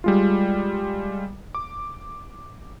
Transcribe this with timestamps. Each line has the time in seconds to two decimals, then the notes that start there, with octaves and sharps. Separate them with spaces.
0.04 G3 G#3 F4
1.55 D6